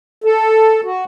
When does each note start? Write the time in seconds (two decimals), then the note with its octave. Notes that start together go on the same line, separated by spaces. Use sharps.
0.24 A4
0.84 F#4